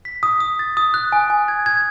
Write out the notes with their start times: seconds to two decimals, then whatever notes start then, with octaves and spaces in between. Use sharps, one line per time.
0.05 B6
0.23 D#6
0.40 D#6
0.59 A6
0.77 D#6
0.94 F#6
1.12 G#5
1.30 G#5
1.48 G#6
1.66 G#6